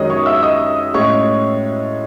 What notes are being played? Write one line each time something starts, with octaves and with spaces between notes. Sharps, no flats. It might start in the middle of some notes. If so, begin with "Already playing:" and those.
Already playing: F#2 D#3 G#3 C#4 D#5 D#6
C#5 C#6
E5 E6
D#5 D#6
A2 G#3 C#4 C#5 C#6